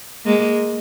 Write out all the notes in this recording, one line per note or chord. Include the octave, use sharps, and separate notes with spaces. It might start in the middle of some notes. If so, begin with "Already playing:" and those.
G#3 A#3